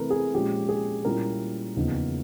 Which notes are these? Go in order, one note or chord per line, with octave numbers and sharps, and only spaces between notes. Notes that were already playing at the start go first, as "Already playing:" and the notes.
Already playing: C3 E3 A3 A#4 B4
G#4
A#2 F3 G#3 C#4 F4 G4
G#4
A#2 G3 A#3 C#4 E4 A#4
E2 C#3 F3 A#3 D#4